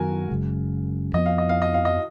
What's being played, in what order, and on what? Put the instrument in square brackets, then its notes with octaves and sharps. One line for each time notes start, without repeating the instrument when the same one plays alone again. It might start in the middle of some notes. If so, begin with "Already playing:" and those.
Already playing: [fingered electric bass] F#2 D#3 F#3 B3 [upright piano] F#4 A#4 G#5
[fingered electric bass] F#1 F#2 C#3 G#3
[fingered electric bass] F2 F3 B3 [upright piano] D#5
[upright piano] F5
D#5
F5
D#5
F5
D#5